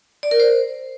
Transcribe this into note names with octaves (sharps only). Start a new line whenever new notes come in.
D5
A#4
C5